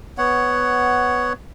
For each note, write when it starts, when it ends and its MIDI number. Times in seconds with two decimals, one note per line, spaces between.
0.18 1.33 59
0.18 1.33 73
0.18 1.33 78